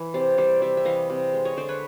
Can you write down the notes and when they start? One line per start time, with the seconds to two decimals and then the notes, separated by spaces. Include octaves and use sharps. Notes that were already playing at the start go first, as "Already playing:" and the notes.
Already playing: E3
0.14 C3 C5 D5
0.37 G3 C5 D5
0.62 C3 D5 E5
0.77 E5
0.85 E3 D#5 F5
1.10 C3
1.33 G#3
1.45 C#5 D#5
1.57 D3 C5 D5
1.69 B4 C#5